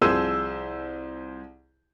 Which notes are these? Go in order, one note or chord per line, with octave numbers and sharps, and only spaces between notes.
C2 F3 G#4 C5 E6 D#7